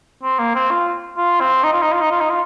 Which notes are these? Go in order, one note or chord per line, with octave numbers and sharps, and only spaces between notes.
C4
A#3
C4
F4
F4
C4
D#4
F4
D#4
F4
D#4
F4
D#4
F4